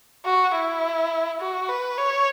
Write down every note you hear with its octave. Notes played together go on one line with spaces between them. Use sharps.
F#4
E4
F#4
B4
C#5